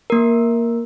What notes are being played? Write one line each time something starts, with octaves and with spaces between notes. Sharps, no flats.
A#3 A#4